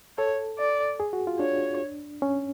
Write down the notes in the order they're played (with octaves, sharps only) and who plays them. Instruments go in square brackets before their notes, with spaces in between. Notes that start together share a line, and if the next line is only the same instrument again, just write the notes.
[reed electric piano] A4 [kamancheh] C#5
[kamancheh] D5
[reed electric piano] G#4
F#4
F4
[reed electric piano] D4 [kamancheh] C#5
[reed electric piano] C#4